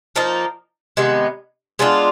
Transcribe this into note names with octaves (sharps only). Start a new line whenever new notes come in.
F3 A#3 D#4
C3 D#3 G#3 B3
G#3 B3 D4 F4